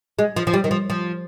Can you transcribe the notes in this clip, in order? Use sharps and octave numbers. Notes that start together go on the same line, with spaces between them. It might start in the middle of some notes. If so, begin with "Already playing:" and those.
G#3
F3
F3
G3
D#3
F3
F3